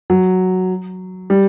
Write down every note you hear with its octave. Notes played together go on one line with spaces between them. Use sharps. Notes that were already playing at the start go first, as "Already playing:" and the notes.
F#3
G3